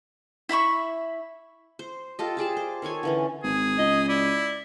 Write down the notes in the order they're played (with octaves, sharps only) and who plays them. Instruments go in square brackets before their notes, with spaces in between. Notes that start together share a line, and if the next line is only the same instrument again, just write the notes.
[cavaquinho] E4 E5 B5 C#6
[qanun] C5
F4 G4 A4 D#5
G4 G#4 D5 A5
C5
D#3 A4 C#5 G#5
D3 E3 C#4
[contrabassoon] G#1 [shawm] G#4
[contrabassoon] C#2 [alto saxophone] D#5
[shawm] E4 [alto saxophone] D5